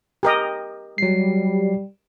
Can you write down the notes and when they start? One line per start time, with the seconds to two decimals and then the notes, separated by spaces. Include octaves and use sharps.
0.23 G4 A#4 D#5
0.98 F#3 G3 C7